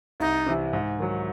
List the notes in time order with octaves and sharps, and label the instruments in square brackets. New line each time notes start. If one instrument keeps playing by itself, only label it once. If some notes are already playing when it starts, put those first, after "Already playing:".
[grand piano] C2 [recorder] D#4
[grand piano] C3 E3
G#2
D#3 F#3